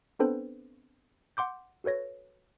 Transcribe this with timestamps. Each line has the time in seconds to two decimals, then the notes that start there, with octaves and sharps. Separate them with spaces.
0.19 B3 C4 D4 A4 B4 C5
1.37 F#5 C6 D6 G6
1.84 F#4 A4 B4 C#5 A#6